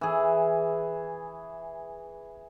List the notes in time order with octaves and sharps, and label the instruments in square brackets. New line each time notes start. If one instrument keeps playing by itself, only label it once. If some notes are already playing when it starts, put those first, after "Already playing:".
[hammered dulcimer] E3 G#4